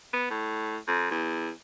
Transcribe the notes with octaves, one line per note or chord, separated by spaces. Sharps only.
B3
A2
F2
E2